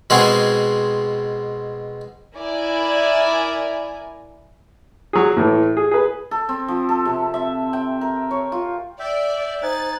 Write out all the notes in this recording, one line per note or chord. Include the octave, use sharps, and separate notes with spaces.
B2 G#3 C4 G#4
E4 A#4 D5 G#5
F#3 G#4
A2 E3
G#4
G#4 B4
A4
C4
F3
A4
C3
E5
G5
A#4
C#5
F4
D5 E5 G5
D#4 C5 G#5 F#6 A6